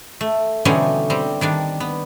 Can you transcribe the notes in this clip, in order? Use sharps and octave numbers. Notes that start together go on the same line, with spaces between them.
A3
B2 D3 E3 G3 C#4 D#4
G3 C4
D#3 G3 D4
B3